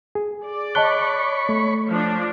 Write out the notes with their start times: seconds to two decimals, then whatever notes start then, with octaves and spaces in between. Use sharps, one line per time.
0.15 G#4
0.45 D5
0.75 C#5 D#5 A5 B5 C#6 F#6 G7
1.49 A3
1.89 F3 D4